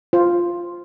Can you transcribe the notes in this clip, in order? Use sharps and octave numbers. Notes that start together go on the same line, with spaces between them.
F4 C5